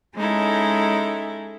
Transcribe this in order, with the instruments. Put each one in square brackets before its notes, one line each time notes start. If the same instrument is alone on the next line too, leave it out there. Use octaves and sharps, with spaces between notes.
[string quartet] G#3 C#4 D#4 E4 A4